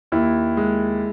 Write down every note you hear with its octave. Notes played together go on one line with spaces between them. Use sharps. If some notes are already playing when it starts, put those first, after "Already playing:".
D#2 E4
G#3